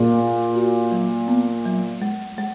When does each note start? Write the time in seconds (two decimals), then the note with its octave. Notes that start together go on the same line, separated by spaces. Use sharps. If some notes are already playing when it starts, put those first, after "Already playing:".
Already playing: A#2 G#4
0.19 A#3
0.55 F#4
0.92 F#3
1.28 B3
1.65 F#3
2.02 G#3
2.38 G#3